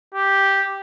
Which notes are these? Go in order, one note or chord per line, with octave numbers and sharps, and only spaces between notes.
G4